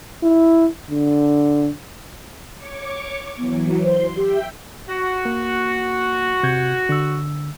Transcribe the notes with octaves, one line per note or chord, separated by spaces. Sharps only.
E4
D3
C#5 C#6 D6
E3 F#3 B3
C5 C6
G4 E5 G5
F#4
A#3
C3 G6 G#6
D3 E6